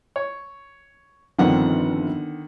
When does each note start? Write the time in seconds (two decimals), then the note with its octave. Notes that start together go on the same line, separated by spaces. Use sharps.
0.16 C#5
1.38 G1 D3 D#3 F3 C4 F#5